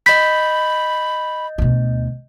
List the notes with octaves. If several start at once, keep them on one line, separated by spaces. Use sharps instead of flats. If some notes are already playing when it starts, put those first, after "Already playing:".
D#5 B5 G6 B6
D2 B2